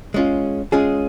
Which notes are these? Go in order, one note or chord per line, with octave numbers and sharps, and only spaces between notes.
G#3 C#4 F4
G#3 C#4 F4 G#4